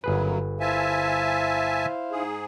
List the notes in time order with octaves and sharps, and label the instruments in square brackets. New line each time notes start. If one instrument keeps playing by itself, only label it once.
[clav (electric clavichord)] G1 G#4 B4 [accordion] F#2 C#3 F#3
[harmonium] E4 C5 F5 [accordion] E5 G#5 A5
[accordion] G#2 G#4